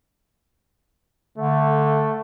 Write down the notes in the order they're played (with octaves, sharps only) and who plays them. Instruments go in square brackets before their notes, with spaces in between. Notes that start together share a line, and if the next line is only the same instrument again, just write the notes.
[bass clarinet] D3 [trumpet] A3